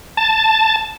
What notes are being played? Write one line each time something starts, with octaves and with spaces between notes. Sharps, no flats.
A5